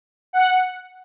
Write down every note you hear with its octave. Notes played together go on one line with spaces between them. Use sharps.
F#5